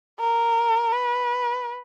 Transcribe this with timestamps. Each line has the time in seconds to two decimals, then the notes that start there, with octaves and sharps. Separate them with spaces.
0.20 A#4
0.92 B4